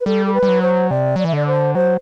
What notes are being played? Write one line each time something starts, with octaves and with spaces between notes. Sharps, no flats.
B4
G3 A4
A4
B4
G3
F#3
C5
C3 D5
F#3 D5
E3 E5
D3 D5
C5
F#3 C5